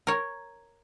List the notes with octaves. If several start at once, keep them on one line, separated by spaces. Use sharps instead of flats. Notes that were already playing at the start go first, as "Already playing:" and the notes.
A#4 C#5